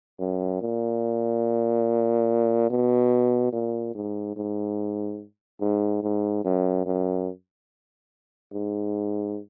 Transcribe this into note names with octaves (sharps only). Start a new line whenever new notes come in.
F#2
A#2
B2
A#2
G#2
G#2
G#2
G#2
F#2
F#2
G#2